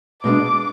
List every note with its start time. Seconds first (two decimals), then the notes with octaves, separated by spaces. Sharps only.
0.23 B2 G#3 B3 D4 D6